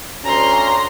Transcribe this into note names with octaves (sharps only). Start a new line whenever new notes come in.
D2 C#4 A#5 C6